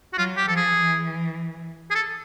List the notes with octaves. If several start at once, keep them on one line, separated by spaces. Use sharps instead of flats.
F#4
F#3 F4
G4
F3 A4
G#4
E3
G#4
A4